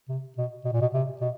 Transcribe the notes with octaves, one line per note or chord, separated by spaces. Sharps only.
C3
B2
B2
A#2
B2
C3
B2